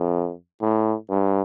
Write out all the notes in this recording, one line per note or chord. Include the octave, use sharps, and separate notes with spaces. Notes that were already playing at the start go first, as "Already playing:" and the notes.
Already playing: F2
A2
G2